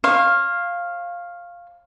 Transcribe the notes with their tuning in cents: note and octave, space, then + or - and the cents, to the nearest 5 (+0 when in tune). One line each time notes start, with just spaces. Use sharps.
C#5 -35 F5 +0